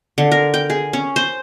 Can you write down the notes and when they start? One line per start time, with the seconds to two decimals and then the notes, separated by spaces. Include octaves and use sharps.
0.18 D3
0.32 A#4
0.54 G5
0.70 G#4
0.93 C#4
1.16 C5